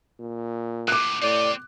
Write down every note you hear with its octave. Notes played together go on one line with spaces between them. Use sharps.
A#2
C#2 A2 D6 F#6
A2 C4 G4 D5